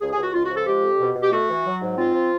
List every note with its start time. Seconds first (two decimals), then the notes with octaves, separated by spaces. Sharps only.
0.01 C#2 G#4
0.12 G#4
0.17 C#2
0.23 F#4
0.34 C#2 F4
0.45 F#4
0.51 F3 A4
0.66 G#3 G4
0.82 F2
0.99 B2
1.15 B2
1.22 G4
1.32 A3 F#4
1.49 E3
1.65 F#3
1.81 G#2
1.98 C4 F4
2.14 F3